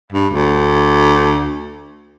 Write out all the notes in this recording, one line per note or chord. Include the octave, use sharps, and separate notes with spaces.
G2
D2